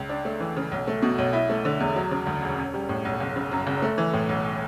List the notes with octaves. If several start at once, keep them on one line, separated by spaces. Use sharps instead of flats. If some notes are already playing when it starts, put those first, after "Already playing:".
Already playing: C#2
D4
A3
E3
C#3
B1
A3
B2
B1
E4
A3
D3
E2
F#3
C#3
D2
E1
C#4
G3
A2
B1
F#1
C#3
F#2
F#1
A3
E3
A2
B1